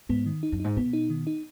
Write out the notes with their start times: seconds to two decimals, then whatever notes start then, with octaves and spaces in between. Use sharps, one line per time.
0.09 G#2 B3
0.26 D#3
0.43 D#4
0.52 F#2
0.60 G#2 D#4
0.76 B2 B3
0.93 D#4
1.10 D#3
1.27 D#4